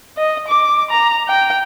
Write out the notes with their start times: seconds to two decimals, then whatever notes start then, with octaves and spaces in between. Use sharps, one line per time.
0.17 D#5
0.48 D6
0.90 A#5
1.28 G5